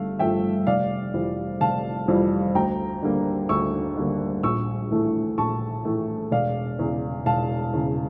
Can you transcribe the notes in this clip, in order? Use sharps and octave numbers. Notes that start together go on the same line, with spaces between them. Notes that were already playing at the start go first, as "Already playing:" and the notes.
Already playing: G1 G2 A3 F5
G2 F3 A3 E5 G5
F1 D5 F5
F2 E3 G3
F1 F5 A5
F2 E3 G3
D2 G5 A#5
D3 G3 A#3
D2 C#6 E6
D3 G3 A#3
A#1 C#6 E6
A2 E3 A3
A#1 A5 C#6
A2 E3 A3
E1 D5 F5
E2 C#3
E1 F5 A5
E2 C#3